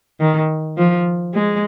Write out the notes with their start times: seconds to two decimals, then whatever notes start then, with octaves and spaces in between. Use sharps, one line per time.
0.20 D#3
0.78 F3
1.34 G#3